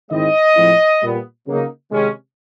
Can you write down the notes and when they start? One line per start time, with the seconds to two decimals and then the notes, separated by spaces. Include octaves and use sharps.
0.11 G#2 D#3 G#3 C4 E4 D#5
0.56 A2 F3 G#3 C4 E4
1.01 A#2 G3 B3
1.47 C#3 F#3 A#3 D#4
1.92 C3 D#3 G#3 C#4